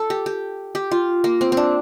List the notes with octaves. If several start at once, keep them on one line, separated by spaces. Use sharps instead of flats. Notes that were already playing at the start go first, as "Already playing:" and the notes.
Already playing: A4
G4
G4
G4
F4
A#3
C4
C4
D4